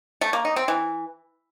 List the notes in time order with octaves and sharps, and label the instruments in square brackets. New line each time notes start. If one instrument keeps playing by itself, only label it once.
[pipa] A3
A#3
D#4
C4
E3